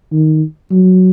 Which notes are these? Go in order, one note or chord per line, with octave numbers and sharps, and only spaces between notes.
D#3
F#3